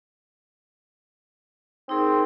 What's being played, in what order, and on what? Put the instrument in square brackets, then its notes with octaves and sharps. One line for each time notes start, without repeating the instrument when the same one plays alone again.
[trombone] C4 [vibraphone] D#4 G#4 A#4